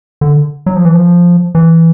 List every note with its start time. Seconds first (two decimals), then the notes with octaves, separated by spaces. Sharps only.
0.21 D3
0.66 F#3
0.76 F3
0.85 E3
0.94 F3
1.55 E3